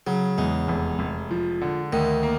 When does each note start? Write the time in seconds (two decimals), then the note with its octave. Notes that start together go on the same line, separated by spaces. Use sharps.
0.07 C#3 F#3
0.38 E2 G#3
0.68 F1
0.99 F1
1.31 F3
1.62 D3
1.92 D2 D#3
2.23 A#3